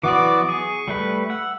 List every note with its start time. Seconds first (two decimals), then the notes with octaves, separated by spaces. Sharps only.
0.03 E3 F#3 B3 F#4 D5 D6
0.48 G#4 C#6
0.88 G3 A3 B4
1.30 F#5 E6